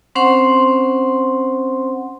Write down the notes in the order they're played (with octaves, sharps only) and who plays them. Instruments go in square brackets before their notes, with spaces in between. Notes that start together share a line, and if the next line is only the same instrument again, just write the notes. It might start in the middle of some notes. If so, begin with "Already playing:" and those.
[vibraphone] C4 C#4 C5 F#5 C6